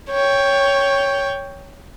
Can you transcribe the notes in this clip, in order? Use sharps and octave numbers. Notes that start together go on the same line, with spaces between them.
C#5 G5